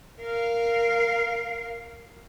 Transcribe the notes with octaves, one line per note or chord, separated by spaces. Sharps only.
A#4 F5